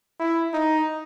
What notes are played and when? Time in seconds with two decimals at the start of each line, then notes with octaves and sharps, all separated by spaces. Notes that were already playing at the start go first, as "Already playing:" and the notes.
0.20 E4
0.54 D#4